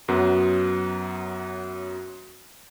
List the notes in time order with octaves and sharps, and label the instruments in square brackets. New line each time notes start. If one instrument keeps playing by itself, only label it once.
[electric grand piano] F#2 F#3 B3